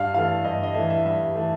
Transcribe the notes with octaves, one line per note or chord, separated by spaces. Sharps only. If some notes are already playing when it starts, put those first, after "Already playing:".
Already playing: G2 F5
E3 A3 F5
G2 D#5
D#5
E3 A3 E5
E5
G2 E5
E3 A3